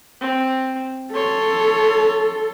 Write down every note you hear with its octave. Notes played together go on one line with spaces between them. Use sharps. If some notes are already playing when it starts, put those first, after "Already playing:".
C4
A4 C#5 C6